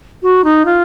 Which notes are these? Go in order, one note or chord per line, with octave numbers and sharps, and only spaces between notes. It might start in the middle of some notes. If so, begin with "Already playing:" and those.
F#4
D#4
F4